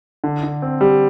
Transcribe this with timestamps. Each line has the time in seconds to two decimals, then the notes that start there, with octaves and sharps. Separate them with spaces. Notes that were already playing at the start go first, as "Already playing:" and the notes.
0.24 D3
0.43 D3
0.62 C4
0.81 G3